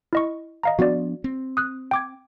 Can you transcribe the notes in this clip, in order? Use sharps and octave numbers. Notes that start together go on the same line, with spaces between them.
E4 D#5 C#6
D#5 F5 A#5
F3 B3 D4 F#4 D5
C4
D#6 F#6
G5 D6 G#6